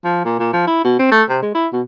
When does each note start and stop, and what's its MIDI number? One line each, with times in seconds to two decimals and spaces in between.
0.04 0.24 53
0.25 0.39 46
0.39 0.51 46
0.53 0.67 53
0.67 0.83 64
0.84 0.97 47
0.99 1.08 60
1.12 1.23 57
1.29 1.40 48
1.42 1.53 56
1.55 1.68 64
1.73 1.81 47